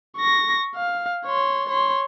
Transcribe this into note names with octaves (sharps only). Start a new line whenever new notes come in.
C#6 A#6
F5
C#5 C6
C#5 C6